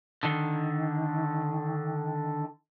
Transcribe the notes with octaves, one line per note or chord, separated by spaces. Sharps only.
D3 D#3